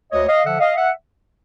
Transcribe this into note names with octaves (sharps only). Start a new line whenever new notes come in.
D2 C#5 D#5
D#5 F5
D3 F3 E5 F#5
D#5 F5
E5 F#5